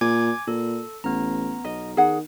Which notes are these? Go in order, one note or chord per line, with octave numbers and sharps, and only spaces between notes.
A#2 G#5 D6 G#6
A#2 A4
A1 B3 A#5
B1 D#5
D#3 G#4 F#5